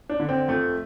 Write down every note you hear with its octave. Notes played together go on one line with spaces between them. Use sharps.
D4
D3
C4
F2 A3